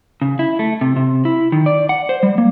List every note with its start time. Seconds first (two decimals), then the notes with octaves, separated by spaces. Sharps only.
0.22 C#3
0.39 E4
0.59 A3
0.81 C3
0.96 C3
1.25 E4
1.52 D#3
1.66 D5
1.89 F#5
2.09 C5
2.23 G3
2.38 A#3